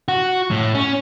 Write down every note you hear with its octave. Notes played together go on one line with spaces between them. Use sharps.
F#4
A2
C#4